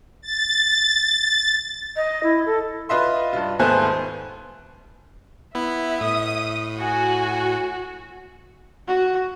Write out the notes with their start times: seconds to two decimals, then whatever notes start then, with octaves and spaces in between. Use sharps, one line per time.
0.21 A6
1.96 D#5
2.23 E4
2.46 A4
2.89 F4 B4 D#5 E5 C6
3.33 G2 F4
3.59 D#2 G#2 A3 B3 C5 G#5
5.55 B3 E4 E5
6.01 A2 D#6
6.79 F#4 G#5
8.88 F#4